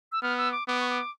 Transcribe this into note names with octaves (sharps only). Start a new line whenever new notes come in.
E6
B3 F6
E6
D6
B3 D6
C#6
D6